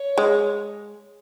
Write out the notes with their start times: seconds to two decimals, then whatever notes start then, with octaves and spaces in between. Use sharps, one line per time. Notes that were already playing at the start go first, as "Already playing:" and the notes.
Already playing: C#5
0.18 G#3